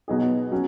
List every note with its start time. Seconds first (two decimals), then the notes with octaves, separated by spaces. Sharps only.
0.08 B2 F#3 B3 D#4 G#4
0.52 F#3 C#4